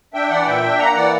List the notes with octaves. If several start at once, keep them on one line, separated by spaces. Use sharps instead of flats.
D4 E5 G5
E3 D5 F#5
A#2 E5 G5
D4
A#3 F#5 A#5
E3 D5 F#5